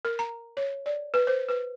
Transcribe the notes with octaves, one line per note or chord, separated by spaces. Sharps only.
A#4
A#5
C#5
D5
B4
C5
B4